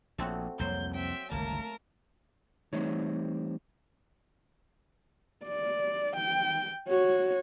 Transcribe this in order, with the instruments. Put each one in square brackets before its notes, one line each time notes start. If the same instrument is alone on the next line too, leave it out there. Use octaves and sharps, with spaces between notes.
[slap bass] A#1 [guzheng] A3 C4 F#4
[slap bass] C2 F2 A#3 [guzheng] F#3 C5 [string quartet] G6
[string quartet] C4 E5 G5
[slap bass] G1 C#2 D#3 [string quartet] A3 A#4 A5 [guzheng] A#3
[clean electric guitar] E3 G3 A3 C4 D#4 C#5
[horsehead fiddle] D5
G5
F#4 C#5